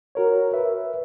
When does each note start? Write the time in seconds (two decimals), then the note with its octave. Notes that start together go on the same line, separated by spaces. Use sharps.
0.15 F#4 A#4 C#5
0.53 B4 E5